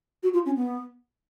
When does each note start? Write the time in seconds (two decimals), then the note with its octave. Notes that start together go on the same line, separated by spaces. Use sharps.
0.23 F#4
0.33 F4
0.46 C#4
0.56 B3